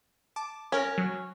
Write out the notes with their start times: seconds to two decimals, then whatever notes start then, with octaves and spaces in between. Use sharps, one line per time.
0.36 A5 D6
0.72 C#4 A#4 F6
0.98 F#3